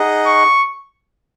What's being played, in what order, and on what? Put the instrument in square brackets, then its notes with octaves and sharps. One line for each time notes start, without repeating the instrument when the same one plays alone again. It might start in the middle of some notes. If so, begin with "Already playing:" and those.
Already playing: [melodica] D#4 G#4 D#5 F#5
[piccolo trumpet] C#6